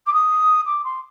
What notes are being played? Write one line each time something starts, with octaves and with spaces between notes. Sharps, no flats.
D6
D#6
D6
C6